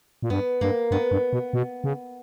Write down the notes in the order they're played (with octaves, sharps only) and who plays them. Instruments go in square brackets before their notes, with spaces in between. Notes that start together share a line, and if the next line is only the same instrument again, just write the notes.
[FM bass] A#2
[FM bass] G2 [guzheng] B3
[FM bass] G2 [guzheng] A#3
[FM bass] G2 [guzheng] B3
[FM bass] G2
B2
B2
C#3